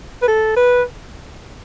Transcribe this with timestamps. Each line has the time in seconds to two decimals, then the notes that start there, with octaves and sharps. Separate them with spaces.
0.22 B4
0.28 A4
0.56 B4